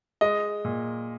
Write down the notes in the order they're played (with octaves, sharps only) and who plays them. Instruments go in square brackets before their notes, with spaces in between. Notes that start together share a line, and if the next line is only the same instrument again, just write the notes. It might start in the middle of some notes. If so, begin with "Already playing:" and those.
[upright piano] G#3 D#5
A#2